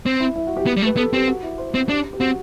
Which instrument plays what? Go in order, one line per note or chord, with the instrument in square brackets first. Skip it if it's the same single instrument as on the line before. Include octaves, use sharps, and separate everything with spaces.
[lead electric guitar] C4
[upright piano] E4
E4
F#4
G4
[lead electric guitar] B3
G3
A3
[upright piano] B4
[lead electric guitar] B3 [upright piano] A4
[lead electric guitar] C4 [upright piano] G4
[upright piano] F#4
E4
C5
[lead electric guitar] C4
[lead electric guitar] D4 [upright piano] G4
[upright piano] G4
[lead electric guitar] C4 [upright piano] F#4